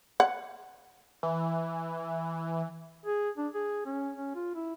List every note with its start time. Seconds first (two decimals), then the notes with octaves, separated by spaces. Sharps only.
0.20 F#5
1.23 E3
3.06 G#4
3.38 D4
3.54 G#4
3.86 C#4
4.17 C#4
4.35 F4
4.55 E4